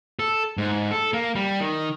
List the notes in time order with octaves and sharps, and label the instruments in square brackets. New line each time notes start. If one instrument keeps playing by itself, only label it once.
[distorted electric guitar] A4
G#2
A4
A#3
G3
D#3